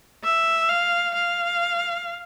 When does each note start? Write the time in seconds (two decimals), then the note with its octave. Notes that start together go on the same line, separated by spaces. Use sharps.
0.24 E5
0.69 F5
1.14 F5